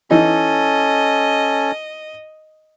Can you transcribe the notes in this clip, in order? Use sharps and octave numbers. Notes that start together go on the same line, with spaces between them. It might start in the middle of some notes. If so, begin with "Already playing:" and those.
E3 C#4 D#4 A4 D#5